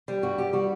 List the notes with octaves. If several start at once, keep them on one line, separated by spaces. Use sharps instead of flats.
G3
G2 F#4
G2 G4
G3 F#4